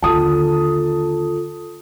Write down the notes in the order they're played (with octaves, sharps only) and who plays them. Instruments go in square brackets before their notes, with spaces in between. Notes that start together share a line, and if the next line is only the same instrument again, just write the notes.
[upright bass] D#2 D3 [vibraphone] F4 A4 [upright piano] A5 D#6